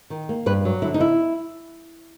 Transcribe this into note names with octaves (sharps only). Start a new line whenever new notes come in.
D#3
A#3
G2 B4
F#3
D3 E4
D#4
E4